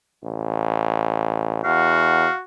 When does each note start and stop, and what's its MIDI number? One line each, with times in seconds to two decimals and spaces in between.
0.23 1.63 33
1.64 2.26 40
1.64 2.44 66
1.64 2.33 77